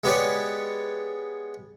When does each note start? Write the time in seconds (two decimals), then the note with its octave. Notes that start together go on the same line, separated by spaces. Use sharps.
0.04 G#3 B3 G4 B4 C#5 D5